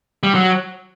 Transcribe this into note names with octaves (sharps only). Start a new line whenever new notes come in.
G3
F#3